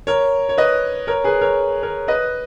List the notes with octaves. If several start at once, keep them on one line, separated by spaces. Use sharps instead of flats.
A#4 C#5
C#5
B4 D#5
A#4 C#5
G#4 B4
A#4 C#5
A#4 C#5
B4 D#5